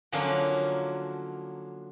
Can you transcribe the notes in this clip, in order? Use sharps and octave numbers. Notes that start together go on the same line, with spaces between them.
D3 F3 F#3 A#3 C#4 D4